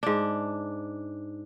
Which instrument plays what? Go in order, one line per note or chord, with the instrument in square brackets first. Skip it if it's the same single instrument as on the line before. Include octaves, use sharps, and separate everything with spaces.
[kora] G#2 D4